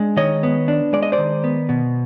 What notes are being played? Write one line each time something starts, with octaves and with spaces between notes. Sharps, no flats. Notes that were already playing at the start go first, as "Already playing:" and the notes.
Already playing: G#3 D4
D#3 C#5 D#5
B3
D4
G#3 D5
D#5
C5 D5
D#3
B3
B2